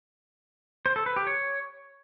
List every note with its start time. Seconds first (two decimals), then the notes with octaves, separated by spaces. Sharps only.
0.86 C5
0.96 A4
1.06 B4
1.16 G4
1.27 C#5